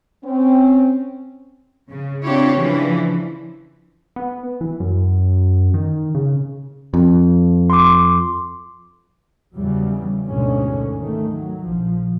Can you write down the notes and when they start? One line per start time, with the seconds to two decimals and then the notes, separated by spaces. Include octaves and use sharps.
0.24 C4 C#4
1.89 C#3
2.23 C4 D4 E4 F4 G4 C#5
2.56 C#3 E3 F3 D4
4.16 B3
4.61 E3
4.80 F#2
5.74 D#3
6.15 C#3
6.94 F2
7.70 C6 D6
9.56 E2 C#3 F#3 G3
10.26 D2 G#2 B2 D3 G#3 C#4
11.00 D#3 A3
11.31 F#3
11.64 A#1 F3